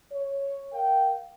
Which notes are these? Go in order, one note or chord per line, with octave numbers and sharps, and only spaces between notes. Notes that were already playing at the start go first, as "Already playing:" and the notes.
C#5
A#4 F5 G5